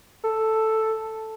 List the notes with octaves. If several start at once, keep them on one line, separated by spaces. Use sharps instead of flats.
A4